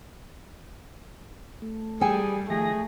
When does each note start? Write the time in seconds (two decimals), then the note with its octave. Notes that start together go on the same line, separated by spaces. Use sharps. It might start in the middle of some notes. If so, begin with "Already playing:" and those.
1.62 A3
2.01 G3 G#4 A4 G5 G#5
2.50 D#3 F3 A3 G#4 A#6